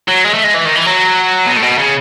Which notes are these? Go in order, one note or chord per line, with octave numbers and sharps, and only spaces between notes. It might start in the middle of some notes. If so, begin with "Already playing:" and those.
F#3
G#3
A3
G#3
E3
D#3
E3
F#3
B2
A2
B2
C#3